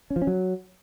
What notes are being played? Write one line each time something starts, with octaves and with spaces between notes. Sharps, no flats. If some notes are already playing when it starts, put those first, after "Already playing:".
C#4
F3
C#4
F#3